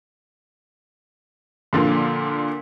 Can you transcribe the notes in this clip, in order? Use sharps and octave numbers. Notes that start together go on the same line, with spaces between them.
A#2 D3 F3 A#3